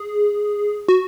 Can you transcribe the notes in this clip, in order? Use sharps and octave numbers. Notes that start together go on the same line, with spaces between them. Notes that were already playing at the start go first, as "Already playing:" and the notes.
Already playing: G#4
F#4